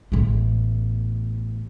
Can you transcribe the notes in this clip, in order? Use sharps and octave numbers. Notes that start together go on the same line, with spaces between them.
A1 B3